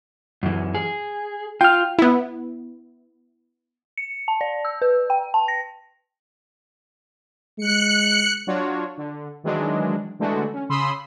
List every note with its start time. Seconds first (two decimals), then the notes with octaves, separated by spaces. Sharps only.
0.43 F#2 E3
0.75 G#4
1.61 F4 G5 F6
1.99 B3 E4
3.97 C#7
4.28 A5
4.41 D5
4.65 E6
4.82 B4
5.10 G5
5.34 A5
5.48 A#6
7.58 G#3 F#6 C#7
8.47 F#3 D4 F4 F#4 C#5
8.97 D3
9.44 D#3 E3 F#3 G#3 D4
10.19 D3 E3 G#3 A3 D4 F#4
10.53 C#4
10.69 C#3 B5 C6 D#6 E6